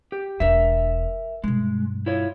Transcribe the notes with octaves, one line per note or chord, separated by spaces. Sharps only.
G4
E1 D4 A#4 E5
G2 B2 G#3
E4 F4 C#5